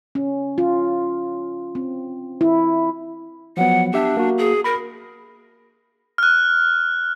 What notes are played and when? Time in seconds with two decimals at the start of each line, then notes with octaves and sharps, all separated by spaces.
0.15 C#4
0.58 F4
1.75 C4
2.41 E4
3.57 F3 F#3 B3 F#5
3.93 B3 D4 G4 E5
4.17 A#3 F#4
4.38 G#4
4.64 A#4 B5 A#6
6.18 F6 F#6